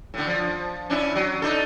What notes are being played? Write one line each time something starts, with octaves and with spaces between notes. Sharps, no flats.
A2 D3
F3
C#4 D4 E4
F#3
D4 D#4 A4